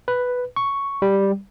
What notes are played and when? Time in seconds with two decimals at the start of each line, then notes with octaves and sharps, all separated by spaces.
0.08 B4
0.56 C#6
1.02 G3